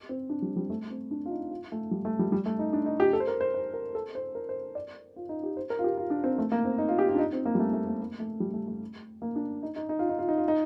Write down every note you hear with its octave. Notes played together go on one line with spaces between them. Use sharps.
C4
D4
G3
G3
A3
C4
D4
F4
D#4
F4
A3
G3
A3
G3
G3
A3
D#4
D4
D#4
G4
A4
C5
A#4
C5
C5
A#4
A4
C5
A#4
C5
D5
F4
D#4
G4
C5
A#4
F4
G4
F4
D4
C4
A3
A#3
C4
D#4
F4
G4
F4
D4
D#4
C4
A#3
G3
A3
A3
A#3
A#3
A3
G3
A3
A3
A#3
D4
D#4
D#4
D#4
F4
D#4
F4
D#4
F4
D#4